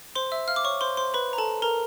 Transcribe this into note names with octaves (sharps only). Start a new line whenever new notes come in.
C5 C6
E5 E6
F5 F6
D6
C#5 C#6
C5 C6
C5 C6
B4 B5
A#5
A4 A5
A#4 A#5